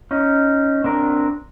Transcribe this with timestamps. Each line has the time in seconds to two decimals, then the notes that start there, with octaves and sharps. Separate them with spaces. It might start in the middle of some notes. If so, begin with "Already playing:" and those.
0.11 C#4 D#4
0.84 C4 D4 A#4